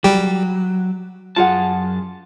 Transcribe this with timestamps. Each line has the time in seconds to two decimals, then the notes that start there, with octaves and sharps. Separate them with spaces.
0.04 F#3 G3 G4
1.36 F#2 F4 G#4 F#5 A5